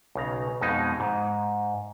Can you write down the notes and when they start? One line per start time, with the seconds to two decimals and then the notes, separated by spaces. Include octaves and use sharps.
0.15 B1 C#3 A#5
0.61 F2 B2 G#3 D#4
1.00 G#2